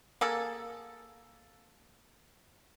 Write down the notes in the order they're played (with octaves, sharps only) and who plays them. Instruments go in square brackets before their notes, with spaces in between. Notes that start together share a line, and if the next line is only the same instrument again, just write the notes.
[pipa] A#3 G#4 A4